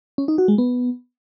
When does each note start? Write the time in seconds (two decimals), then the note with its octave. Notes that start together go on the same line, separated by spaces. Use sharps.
0.18 C#4
0.28 D#4
0.38 F#4
0.48 G#3
0.58 B3